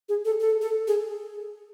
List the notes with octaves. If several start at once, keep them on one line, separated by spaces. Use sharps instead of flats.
G#4
A4
A4
A4
G#4